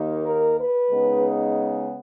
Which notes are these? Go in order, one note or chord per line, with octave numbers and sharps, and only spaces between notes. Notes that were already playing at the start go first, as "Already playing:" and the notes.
Already playing: D#2 D#3 A#3 D#4
A#4
B4
C#3 G#3 B3 D#4